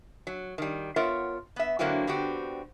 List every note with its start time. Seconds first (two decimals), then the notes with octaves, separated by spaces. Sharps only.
0.27 F#3
0.58 D#3 G3
0.96 B3 F4 A#4 C#5 E5 F#5
1.56 B3 E5
1.79 D3 F#3 A#3 C4 E4 F#4
2.07 D3 B3 C4 F#4 G4